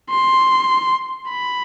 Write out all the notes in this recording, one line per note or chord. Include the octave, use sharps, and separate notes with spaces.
C6
B5